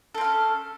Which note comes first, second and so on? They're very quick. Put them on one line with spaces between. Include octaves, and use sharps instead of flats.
A4 C4 F5 C#4